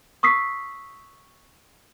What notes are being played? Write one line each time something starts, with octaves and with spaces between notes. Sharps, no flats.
C#6 D#6 E6 B6 C7